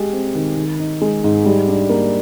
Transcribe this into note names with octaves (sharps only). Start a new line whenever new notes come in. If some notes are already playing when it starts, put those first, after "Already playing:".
Already playing: G#3 G4
C4
D#3
D#3
D#4
G#3
G#2
G3
D4
A#3